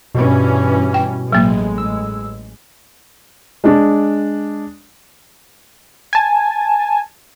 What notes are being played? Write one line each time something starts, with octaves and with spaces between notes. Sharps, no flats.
G2 B2 E3 C#4
G5
A1 F#3 G#3 A#3
E6
G#3 D4
G#5 A5